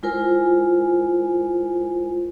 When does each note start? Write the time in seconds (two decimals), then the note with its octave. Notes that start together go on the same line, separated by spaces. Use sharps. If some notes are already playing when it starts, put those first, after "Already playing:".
0.03 G#3 E4 F4 A#4 C5 G#5